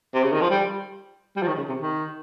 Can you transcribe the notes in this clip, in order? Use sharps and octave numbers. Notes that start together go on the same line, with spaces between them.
C3
C#3
D#3
F3
G3
G3
F3
D#3
C#3
C3
D#3